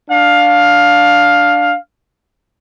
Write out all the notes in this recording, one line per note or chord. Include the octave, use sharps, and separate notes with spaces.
D4 F5